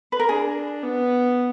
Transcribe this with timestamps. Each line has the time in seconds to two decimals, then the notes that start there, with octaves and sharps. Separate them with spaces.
0.12 B4
0.20 A#4
0.29 D4 G#4
0.83 B3